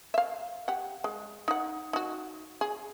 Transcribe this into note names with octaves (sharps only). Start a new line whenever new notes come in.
E5 F5
G4 F#5
G#3
D#4 F#5
D#4 F#4
G#4